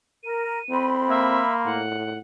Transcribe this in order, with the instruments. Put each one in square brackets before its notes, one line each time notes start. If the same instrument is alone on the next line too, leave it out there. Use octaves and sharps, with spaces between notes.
[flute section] A#4 [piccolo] D#7
[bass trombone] C4 [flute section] B5 C6
[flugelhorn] A#3 [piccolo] E5
[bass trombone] A2 [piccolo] F#5